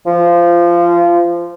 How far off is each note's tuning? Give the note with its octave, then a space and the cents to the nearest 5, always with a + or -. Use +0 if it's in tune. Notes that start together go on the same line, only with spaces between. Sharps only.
F3 -20